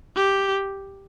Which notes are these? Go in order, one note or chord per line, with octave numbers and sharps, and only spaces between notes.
G4